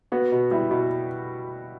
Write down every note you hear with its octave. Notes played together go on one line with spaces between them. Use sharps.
B3 F#4
B2
G3 E4
B2